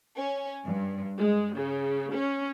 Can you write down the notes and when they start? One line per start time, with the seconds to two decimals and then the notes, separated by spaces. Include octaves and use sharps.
0.17 C#4
0.66 G2
1.17 G#3
1.55 C#3
2.12 C#4